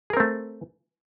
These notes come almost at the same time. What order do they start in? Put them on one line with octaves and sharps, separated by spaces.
G#4 A#4 C4 A3